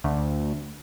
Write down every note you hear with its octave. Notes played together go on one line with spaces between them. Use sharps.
D2